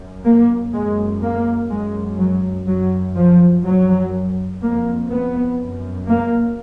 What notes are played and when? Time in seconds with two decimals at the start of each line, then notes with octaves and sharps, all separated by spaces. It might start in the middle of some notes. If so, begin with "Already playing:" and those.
Already playing: F#2
0.25 A#3
0.73 F#2 G#3
1.22 A#3
1.70 F#2 G#3
2.19 F#3
2.67 F#2 F#3
3.16 F3
3.65 F#2 F#3
4.61 F2 A#3
5.10 B3
5.58 F#2
6.07 A#3